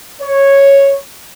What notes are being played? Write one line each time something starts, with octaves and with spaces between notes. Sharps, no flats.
C#5